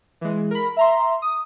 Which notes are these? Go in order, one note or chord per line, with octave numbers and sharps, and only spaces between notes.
E3 G#3
A#4 B5
E5 A#5 C6
D#6